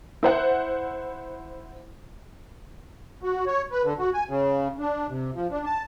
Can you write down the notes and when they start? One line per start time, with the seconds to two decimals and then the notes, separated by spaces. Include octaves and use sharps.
0.23 E4 C5 F#5
3.23 F#4
3.47 C#5
3.72 B4
3.84 D3
3.99 F#4
4.14 G#5
4.28 C#3
4.79 D4
5.09 C3
5.34 F3
5.51 D4
5.66 A5